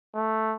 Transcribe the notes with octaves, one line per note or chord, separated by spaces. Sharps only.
A3